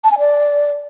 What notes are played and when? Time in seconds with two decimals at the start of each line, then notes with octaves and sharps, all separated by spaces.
0.04 A5
0.11 G#5
0.19 D5